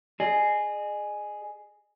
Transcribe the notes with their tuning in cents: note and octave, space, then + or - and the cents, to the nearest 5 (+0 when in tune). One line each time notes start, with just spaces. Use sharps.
G#4 +5 D#5 -35